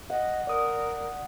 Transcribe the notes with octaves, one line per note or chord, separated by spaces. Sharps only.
D#5 F#5
A#4 D5 D#6